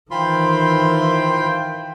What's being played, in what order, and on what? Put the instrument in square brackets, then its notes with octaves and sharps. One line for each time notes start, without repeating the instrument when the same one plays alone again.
[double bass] D#3 E3 [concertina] F4 B5 C6 [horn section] C5 G5